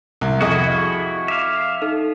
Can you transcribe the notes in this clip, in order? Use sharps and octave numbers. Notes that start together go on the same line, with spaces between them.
C2
F2 E4 F#4 G#4 D#5
E5 F5 D6
D#4 A4